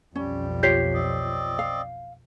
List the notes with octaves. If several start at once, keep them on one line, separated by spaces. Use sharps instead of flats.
B1 F2 G3 C#4
F4 G4 C#5 G6 B6 C7
C4 D5 D#5
F5